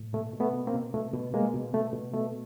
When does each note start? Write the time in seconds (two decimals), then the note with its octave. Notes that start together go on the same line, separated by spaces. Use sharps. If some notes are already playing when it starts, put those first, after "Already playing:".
Already playing: A2
0.13 B2 A3
0.34 B2
0.40 A3 B3
0.53 B2
0.67 A#3 C4
0.74 B2
0.94 B2 A3
1.13 B2
1.34 B2 G#3 A#3
1.54 B2
1.74 B2 A3
1.93 B2
2.13 B2 A3